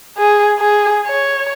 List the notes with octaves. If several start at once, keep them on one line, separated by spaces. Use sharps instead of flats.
G#4
G#4
C#5